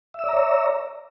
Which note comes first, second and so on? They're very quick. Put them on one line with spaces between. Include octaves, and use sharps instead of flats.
E5 E6 D5 A#5 C#5